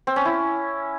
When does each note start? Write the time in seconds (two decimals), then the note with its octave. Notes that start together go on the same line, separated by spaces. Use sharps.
0.07 C4
0.16 C#4
0.25 E4